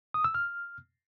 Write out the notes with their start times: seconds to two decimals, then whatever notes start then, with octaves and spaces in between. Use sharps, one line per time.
0.14 D#6
0.24 E6
0.35 F6